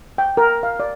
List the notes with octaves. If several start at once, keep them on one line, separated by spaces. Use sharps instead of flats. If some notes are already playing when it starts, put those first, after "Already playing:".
G5
A#4
F5
D5